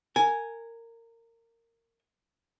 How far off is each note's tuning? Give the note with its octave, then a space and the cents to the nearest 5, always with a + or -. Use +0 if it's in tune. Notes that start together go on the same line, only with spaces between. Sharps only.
A#4 -20 G#5 +0